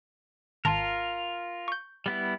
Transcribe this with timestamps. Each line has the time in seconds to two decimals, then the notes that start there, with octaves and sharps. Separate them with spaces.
0.65 G#1 F4 A#4 A5 C6
1.68 C#6 G6
2.06 G3 B3 E4